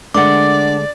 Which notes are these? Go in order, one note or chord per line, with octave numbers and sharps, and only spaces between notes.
D3 G#3 A3 D4 A#4 D5 F#5 D6